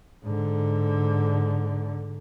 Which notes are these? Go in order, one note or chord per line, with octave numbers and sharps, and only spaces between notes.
G#2 D3